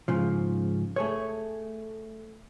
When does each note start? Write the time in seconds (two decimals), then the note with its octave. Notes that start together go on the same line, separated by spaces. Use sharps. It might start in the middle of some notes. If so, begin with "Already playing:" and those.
0.08 G#2 C#3 F3
0.96 A3 G#4 C#5